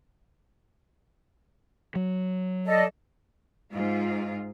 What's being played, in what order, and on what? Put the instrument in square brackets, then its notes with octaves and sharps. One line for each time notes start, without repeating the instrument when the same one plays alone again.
[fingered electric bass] F#3
[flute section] A4 D5 D#5
[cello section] G#2 F4